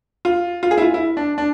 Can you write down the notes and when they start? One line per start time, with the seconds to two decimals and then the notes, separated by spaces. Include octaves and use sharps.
0.25 F4
0.63 F4
0.71 G#4
0.78 E4
0.82 F4
0.94 E4
1.17 D4
1.38 D4